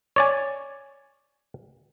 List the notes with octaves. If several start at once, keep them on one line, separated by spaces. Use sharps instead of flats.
C#5 D5 G#5